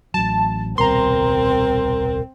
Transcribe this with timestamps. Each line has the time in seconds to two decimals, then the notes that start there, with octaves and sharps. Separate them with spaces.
0.14 A1 F#3 A5
0.78 D#1 C2 B2 C4 A#4 A#5 C6